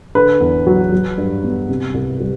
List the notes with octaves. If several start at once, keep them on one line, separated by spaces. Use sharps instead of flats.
D3 B4
E2
F#3
F#3
G2
B3
C3
C2
G3